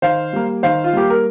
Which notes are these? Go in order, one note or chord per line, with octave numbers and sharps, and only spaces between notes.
D#3 C5 F5
G3 A#3
D#3 C5 F5
F4
G3 A#3 G4
A#4